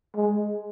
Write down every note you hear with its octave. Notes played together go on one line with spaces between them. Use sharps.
G#3